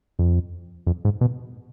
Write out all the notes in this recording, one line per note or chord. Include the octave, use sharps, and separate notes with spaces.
F2
F2
G#2
B2